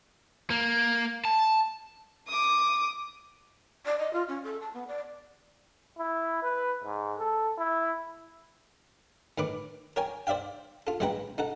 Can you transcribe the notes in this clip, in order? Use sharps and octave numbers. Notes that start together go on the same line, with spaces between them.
A#3
A5
D6 D#6
D5
D#5
F4
C#4
A4
A5
B3
D5
E4
B4
G#2
A4
E4
A2 D#3 B4 D6
A#4 C#5 G5 G#5
C5 D5 E5 F5 G5
F4 A4
A1 G#3 E4 B4 G5 A#5
D#4 A4 F#5